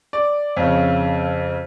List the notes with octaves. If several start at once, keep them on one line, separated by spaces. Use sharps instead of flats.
D5
F2 C#3